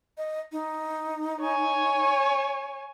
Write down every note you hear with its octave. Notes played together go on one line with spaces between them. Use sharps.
D#5
D#4
C#5 G#5